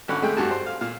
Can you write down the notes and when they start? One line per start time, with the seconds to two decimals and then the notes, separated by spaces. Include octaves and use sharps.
0.08 G#1 D3 C#4 C#5 F#5 B5
0.22 F2 G#3 A3 G#4 G5
0.37 G2 A3 F#4 G4 G#5 A5
0.51 C5
0.66 F5
0.81 A#2 F5